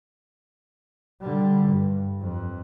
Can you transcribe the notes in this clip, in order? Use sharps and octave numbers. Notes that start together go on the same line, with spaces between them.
D3 G3
G2
F2